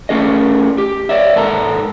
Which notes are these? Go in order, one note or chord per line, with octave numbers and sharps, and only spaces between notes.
A3 C#4 G#4 D#5
G4
C#5 D5 E5
G#2 A4 A#4